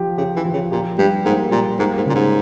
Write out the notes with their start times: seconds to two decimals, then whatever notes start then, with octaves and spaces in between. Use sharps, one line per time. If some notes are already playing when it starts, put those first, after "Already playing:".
Already playing: F3 G4
0.18 C#3 G4
0.36 E3
0.45 F3
0.53 C#3
0.71 A#2 G4
0.98 G2 G3
1.24 G#2 A#3
1.51 A#2 G3
1.79 G#2 A#3
1.97 G#2
2.06 A#2 C#3
2.15 G#2